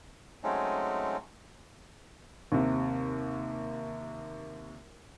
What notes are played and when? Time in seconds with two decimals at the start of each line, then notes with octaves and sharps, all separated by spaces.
0.44 F#3 G#3 A3 C4 C#4 D#4
2.52 D#2 C3